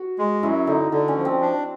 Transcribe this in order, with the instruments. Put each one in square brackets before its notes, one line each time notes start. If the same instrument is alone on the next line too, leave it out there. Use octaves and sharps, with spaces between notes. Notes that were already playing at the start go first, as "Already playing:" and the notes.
Already playing: [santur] F#4
[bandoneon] G#3
[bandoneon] F#2 [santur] E4
[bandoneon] D3 [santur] D#4
[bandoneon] D3 [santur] D4
[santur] C#4
[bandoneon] F3
[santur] C4
[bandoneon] D4